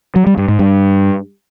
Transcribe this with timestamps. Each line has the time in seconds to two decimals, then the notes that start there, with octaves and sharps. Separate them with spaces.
0.16 F#3
0.27 G3
0.38 G2
0.48 G#2
0.59 G2